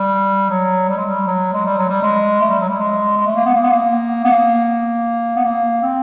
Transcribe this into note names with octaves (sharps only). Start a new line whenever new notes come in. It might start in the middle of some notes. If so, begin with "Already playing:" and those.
Already playing: G3
F#3
G3
G#3
G3
F#3
G#3
G3
F#3
G3
G#3
A3
G3
F#3
G3
G#3
G#3
A3
A#3
B3
A#3
B3
A#3
B3
A#3
B3
A#3
C4